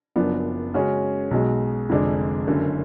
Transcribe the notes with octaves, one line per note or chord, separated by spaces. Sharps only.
F#1 F#2 F3 B3 D4
C#3 G#3 C#4 F#4
B1 B2 G#3
F1 F2 D3 G#3 D4
F#1 F#2 D3